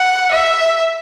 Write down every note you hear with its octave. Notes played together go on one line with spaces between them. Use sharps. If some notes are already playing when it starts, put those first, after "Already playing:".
Already playing: F#5
E5